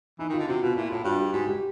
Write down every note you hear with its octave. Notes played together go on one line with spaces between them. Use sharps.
E3 D#4
D#3
F4
D3
C3 F#4
B2 F4
A#2 E4
A2 F4
G2 F#4
G4
G#2 F#4
G4